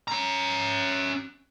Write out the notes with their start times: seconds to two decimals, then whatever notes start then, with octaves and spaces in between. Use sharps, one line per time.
0.08 C#4 A#5